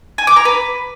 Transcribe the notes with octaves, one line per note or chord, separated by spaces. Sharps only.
G#5
D6
A#5
B4